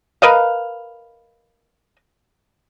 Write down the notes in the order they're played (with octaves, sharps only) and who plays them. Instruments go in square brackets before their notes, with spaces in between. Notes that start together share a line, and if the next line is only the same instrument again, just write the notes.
[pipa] A#4 B4 D#5 F5